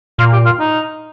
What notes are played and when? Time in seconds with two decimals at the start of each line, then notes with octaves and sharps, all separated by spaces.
0.19 A#2 F4
0.33 G4
0.45 F4
0.59 D#4